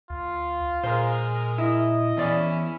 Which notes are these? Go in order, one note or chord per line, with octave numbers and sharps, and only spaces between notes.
D2 F4
A#2 G#3 A#4 C5
E4 D#5
E2 C#4 E4 D5